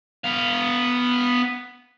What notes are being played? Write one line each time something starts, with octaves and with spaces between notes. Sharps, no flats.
B3 F5